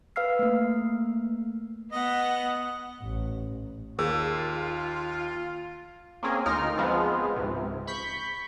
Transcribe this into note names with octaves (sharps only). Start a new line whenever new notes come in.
B4 F5 E6 F6 C7
A3 A#3
B3 D#5 F#5
A1
D#2 F4 G#4 A#4
A#3 C4 C#4 G#4 A#4
D2 D#4 F4 A#4 F6
F3 G#3 B3 C4 F4
C#2 G#2 C3
B5 C#6 G6 B6